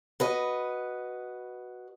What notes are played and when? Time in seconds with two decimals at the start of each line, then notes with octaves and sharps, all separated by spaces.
0.20 F#4 B4 D#5